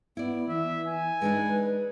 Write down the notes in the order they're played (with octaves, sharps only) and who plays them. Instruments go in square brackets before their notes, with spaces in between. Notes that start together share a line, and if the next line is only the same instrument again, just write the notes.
[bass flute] B3 [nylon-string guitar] E4 D5
[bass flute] E3 [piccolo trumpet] E5
[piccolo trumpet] G#5
[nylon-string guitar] G#3 D4 D#4 [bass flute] B4